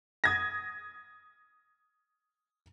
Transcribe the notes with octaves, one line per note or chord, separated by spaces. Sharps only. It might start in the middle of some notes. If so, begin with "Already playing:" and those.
D#6 G#6 A#6